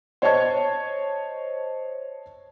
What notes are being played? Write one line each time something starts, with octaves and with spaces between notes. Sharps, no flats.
C5 C#5 D#5 A5 C#6 G#6